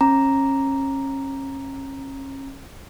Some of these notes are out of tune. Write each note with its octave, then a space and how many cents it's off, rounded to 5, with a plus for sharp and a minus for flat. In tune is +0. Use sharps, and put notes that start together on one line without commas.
C#4 -30 A#5 +0 D6 +0